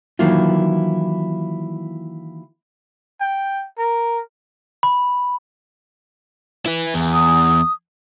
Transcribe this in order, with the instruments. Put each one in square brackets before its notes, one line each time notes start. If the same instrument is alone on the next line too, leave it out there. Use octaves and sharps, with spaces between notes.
[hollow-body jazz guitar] D#3 E3 F#3 A#3 E4 F4
[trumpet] G5
A#4
[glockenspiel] B5
[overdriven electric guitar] E4 B4
E2
[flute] D#6